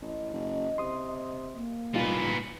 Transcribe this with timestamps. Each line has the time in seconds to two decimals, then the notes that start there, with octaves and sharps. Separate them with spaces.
0.02 A1 D#5
0.33 F#1
0.78 C3 C6 D#6
1.55 A#3
1.94 E1 A#2 G3 B3 D#4 F4